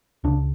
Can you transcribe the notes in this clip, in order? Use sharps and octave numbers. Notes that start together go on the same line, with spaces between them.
C#2 C#3 D4